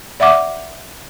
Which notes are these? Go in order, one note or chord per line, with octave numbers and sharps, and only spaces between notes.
D5 E5 F#5 D6